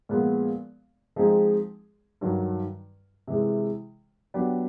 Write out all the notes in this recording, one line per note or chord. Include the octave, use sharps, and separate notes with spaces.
A#2 F3 G#3 B3
F3 G#3 C4 D#4 G#4
G2 D#3 F#3
C3 E3 G#3
F#3 B3 D4 G4